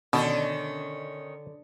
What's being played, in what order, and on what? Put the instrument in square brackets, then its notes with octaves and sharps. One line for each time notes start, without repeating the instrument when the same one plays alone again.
[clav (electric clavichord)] B2 [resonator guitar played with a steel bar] D3 [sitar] D#3 C#4